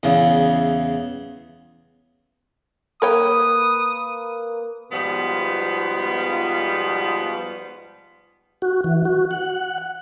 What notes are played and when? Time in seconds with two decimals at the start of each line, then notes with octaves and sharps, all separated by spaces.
0.03 E2 C#3
3.02 A#3 A#4 B4 C#5 G5 D#6
4.92 G#2 B2 F3 G3 B3 F4
8.62 F#4
8.84 E3
9.05 F#4
9.31 F#5